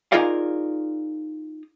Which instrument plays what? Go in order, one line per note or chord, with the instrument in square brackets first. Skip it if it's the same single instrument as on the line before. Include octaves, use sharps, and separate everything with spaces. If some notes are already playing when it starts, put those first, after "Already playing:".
[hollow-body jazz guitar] D#4 F4 G#4 A#4 D5 F5